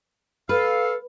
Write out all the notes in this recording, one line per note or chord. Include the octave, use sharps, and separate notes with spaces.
A4 B4 F5